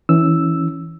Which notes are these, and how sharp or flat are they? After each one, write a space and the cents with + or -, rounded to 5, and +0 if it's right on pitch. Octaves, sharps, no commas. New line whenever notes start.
E3 -15 C#4 +0 E6 +0